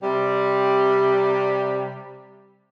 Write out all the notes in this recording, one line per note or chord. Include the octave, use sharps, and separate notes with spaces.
C3 G3